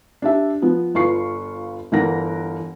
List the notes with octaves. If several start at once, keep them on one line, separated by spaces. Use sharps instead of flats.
D4 G4 E5
F3 B3
G1 F4 B4 C#6 C7
G1 E3 A#4 F#5 A#6